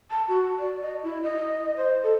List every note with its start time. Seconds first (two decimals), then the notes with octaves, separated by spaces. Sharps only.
0.11 A5
0.28 F#4
0.59 D5
0.82 D#5
1.04 E4
1.23 D#5
1.77 C5
2.03 A4